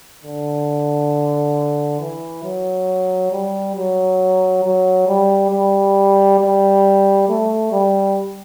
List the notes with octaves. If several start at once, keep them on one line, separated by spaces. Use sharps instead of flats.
D3
E3
F#3
G3
F#3
F#3
G3
G3
G3
A3
G3